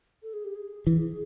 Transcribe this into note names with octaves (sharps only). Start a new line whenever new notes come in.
A4
G#4
G4
G#4
E3